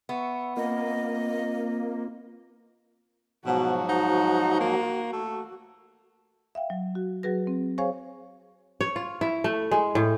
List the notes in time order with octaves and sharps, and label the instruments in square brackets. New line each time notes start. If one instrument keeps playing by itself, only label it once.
[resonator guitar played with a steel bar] B3 [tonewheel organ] E5 C#6
[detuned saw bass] A#3 [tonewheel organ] C4 F4 [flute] D#5
[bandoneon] G#2 F3 F#3 [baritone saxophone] B2 [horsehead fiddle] F#4
[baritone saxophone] D#4
A#3
A3
[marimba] E5 F5 G5
F#3
F#4
F#3 F#4 G#4 B4 A#6
C4
G#4 C5 C#5 F5 G#5 C#6
[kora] C#5
F4
E4
A3
G#3
A2